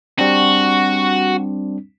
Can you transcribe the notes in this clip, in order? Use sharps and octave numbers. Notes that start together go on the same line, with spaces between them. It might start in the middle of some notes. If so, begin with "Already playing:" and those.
G3 C4 D4 F#4